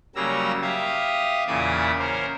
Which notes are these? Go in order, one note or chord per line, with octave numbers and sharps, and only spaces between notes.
C#3 F#3 G3 A#3 A#5 E6
G4 E5 F5 D#6
E2 A#2 C#3 D5 E5 D#6
C#4 A#4 C5